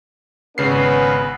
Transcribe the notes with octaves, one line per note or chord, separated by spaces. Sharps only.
G#1 C#3 B3 C#4 B4 C7